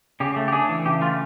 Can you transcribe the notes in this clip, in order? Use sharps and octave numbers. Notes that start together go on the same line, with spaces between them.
C#3 G4
A3
G4
D4 G#4
E3
C#3 G4
A3 F4